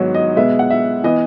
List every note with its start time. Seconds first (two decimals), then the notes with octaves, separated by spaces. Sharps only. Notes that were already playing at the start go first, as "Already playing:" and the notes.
Already playing: G#2 D#3 F#3 B3 C#5
0.14 D#5
0.36 B2 G#3 B3 E5
0.59 F#5
0.70 E5
1.04 E3 B3 D#5